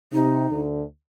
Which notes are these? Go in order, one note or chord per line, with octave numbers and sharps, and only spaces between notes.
C3 D#4
D2 D3